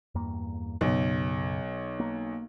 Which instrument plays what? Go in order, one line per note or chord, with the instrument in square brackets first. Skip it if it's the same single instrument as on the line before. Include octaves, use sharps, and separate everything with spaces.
[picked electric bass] E2 G2 A#3
[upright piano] B1 [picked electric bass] F#2 C#3
[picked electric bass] A#3